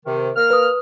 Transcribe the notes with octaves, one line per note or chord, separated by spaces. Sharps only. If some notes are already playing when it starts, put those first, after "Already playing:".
C3 D#3
A#3 A#4 F6
B4 D#6